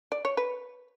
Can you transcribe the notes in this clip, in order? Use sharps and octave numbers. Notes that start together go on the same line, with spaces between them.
D5
C#5
B4